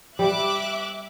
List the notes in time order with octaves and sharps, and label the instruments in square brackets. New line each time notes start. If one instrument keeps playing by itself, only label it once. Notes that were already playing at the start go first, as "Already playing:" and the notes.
[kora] G3 [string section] E5 D6 F#6